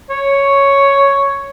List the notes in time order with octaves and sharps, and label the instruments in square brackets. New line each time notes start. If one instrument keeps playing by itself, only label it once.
[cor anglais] C#5